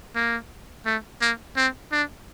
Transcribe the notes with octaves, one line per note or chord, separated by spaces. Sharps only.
A#3
A3
A#3
C4
D4